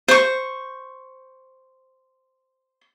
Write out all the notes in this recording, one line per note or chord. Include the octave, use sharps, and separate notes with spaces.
C5 C#6